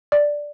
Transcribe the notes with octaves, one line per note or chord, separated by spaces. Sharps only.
D5